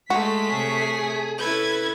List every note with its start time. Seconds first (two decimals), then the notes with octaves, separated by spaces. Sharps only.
0.10 G#3 A3 F#4 B6
0.50 C3 G#4 C#5
1.41 C#4 E4 A4 B4 G#6